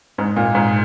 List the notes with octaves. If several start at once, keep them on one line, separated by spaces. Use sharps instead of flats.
G#2
A#2
G#2